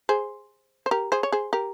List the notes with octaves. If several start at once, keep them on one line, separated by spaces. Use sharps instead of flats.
G#4 C5
C5
G4 A#4
G#4 C5
C#5
G#4 C5
G4 A#4